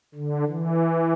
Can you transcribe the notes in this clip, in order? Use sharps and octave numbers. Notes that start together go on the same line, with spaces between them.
D3
E3